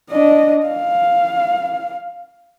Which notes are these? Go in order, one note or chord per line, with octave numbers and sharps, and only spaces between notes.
D4 D#5
F5